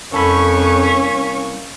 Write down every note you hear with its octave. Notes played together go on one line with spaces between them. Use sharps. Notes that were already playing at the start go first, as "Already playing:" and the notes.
C2 F2 A#3 C#4 A4 B5 C#6